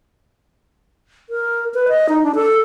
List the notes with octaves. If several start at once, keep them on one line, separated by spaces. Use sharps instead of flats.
A#4
B4
D#5
D#4
D4
A4